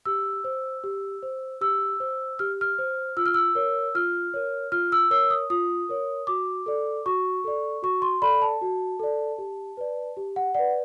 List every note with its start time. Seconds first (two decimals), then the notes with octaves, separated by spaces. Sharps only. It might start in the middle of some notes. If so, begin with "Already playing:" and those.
0.05 G4 E6
0.44 C5
0.84 G4
1.23 C5
1.61 G4 E6
2.00 C5
2.39 G4 F6
2.61 F6
2.79 C5
3.17 F4 E6
3.26 F6
3.34 E6
3.55 A#4 C#5
3.95 F4 F6
4.34 A#4 C#5
4.72 F4 F6
4.92 E6
5.11 A#4 C#5 E6
5.30 D#6
5.50 F4 D#6
5.89 A#4 C#5
6.27 F#4 D6
6.66 A4 D5
7.06 F#4 C#6
7.44 A4 D5
7.83 F#4 C#6
8.02 C6
8.22 A4 D5 B5
8.42 A5
8.61 F#4
8.99 A4 D5
9.38 G4
9.77 B4 D5
10.17 G4
10.36 F#5
10.55 B4 D5 F#5